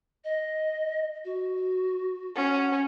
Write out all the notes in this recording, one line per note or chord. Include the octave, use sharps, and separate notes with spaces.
D#5
F#4
C#4 F#5